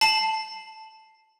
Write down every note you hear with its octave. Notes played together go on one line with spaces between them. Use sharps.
A5 C7 F#7